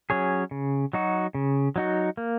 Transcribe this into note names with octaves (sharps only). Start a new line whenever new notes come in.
F#3 C#4 G#4 C#5
C#3
F#3 D#4 F#4
C#3
F#3 D#4 F#4
A#3